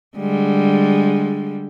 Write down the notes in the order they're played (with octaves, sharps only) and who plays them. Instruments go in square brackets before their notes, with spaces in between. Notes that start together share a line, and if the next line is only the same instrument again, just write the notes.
[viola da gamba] D3 G3 G#3